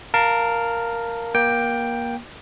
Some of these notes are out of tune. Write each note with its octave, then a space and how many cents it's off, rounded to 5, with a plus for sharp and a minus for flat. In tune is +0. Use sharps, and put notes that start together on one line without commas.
A#4 +0 F5 +0 A5 +20
A#3 +25 G5 +5